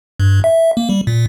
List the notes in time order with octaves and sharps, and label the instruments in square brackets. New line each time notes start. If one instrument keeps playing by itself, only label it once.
[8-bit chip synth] G2
E5
A#3
G3
A#2